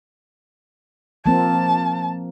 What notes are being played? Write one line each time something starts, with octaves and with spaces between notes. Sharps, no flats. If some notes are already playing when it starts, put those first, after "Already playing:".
F3 A#3 C4 A5